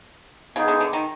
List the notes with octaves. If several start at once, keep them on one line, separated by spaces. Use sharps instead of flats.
C#3 B3 D#4 G#4 B4
D3
D3
D#3